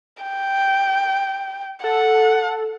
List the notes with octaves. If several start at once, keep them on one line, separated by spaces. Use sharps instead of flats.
G5
A4 F#5